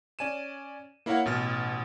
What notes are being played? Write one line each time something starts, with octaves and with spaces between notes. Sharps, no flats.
C#4 D5 G#5 D#7 E7
A#3 E4 A#4 C#5 F5 F#5
A1 B2 F6 A6